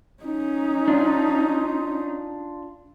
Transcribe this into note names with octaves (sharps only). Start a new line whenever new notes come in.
C#4 D#4
D4 F4